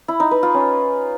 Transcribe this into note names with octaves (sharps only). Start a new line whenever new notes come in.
E4
D#4
B4
F4
C#4